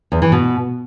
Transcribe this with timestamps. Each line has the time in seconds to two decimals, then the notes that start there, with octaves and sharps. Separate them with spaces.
0.12 E2
0.22 E3
0.32 B2